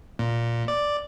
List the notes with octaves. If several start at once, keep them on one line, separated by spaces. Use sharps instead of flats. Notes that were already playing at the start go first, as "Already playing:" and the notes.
A#2
D5